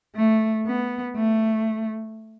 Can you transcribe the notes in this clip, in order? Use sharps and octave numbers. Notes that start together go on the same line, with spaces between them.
A3
B3
A3